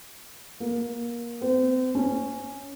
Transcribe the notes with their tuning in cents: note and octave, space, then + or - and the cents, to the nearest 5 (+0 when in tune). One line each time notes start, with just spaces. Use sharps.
A#3 +25
C4 -35
C#4 +0